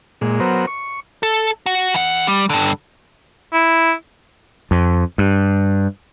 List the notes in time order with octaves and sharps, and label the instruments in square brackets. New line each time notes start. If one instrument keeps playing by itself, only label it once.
[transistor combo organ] A#2 G#3
F#3 B3 A#4 C5
C#6
[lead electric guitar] A4
F#4
E3 F#5
G3
G2 D3
[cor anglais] E4
[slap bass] F2
G2